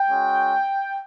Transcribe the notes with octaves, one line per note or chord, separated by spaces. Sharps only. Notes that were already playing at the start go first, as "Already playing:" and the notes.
Already playing: G5
G#3 C#4 F#4